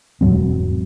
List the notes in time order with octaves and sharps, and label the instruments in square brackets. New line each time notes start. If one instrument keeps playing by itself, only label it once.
[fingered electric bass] E1 G#2 F#3 C4